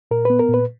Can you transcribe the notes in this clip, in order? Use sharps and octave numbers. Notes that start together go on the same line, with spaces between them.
A#2 A#4
B3 B4
A#4
A#2
B4